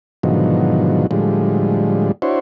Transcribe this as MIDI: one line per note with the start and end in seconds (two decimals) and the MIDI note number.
0.23 1.07 44
0.23 1.07 47
0.23 1.07 50
0.23 1.07 51
0.23 1.07 53
0.23 1.07 54
1.11 2.12 45
1.11 2.12 50
1.11 2.12 53
1.11 2.12 55
1.11 2.12 56
2.22 2.39 62
2.22 2.39 64
2.22 2.39 66
2.22 2.39 72
2.22 2.39 73